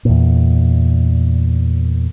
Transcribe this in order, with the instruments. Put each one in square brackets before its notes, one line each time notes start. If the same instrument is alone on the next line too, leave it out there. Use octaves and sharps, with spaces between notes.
[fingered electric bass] E2 A#2